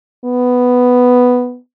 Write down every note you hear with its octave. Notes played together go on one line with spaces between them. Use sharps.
B3